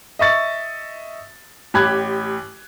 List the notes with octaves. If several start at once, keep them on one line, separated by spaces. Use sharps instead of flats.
D#5 E5 C#6 A6
A1 G4 B5 F#6 G#6